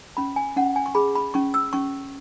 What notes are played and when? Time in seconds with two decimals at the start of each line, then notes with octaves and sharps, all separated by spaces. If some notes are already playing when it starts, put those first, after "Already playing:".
0.17 C#4 B5
0.36 G#5
0.56 C#4 F#5
0.76 G#5
0.86 C#6
0.95 G#4 B5
1.15 B5
1.34 C#4 C#6
1.54 E6
1.73 C#4 C#6